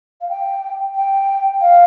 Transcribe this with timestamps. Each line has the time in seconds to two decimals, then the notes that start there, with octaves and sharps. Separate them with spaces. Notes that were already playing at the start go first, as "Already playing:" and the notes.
0.21 F5
0.29 G5
0.96 G5
1.61 F5